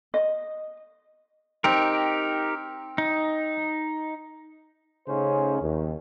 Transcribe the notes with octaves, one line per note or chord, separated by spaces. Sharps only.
D#5
C4 D#4 G4 A#4
D#4
C#3 A3 C#4 D#4 C5
D#2